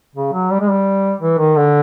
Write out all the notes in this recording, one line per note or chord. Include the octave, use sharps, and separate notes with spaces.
C#3
F#3
G3
G#3
G3
E3
D#3
D3